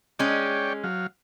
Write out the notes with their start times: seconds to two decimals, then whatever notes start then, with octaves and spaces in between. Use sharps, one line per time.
0.19 G#3 C#4 C#5 D5 G5
0.84 F#3 F5